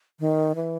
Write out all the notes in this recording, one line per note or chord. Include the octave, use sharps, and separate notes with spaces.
D#3
E3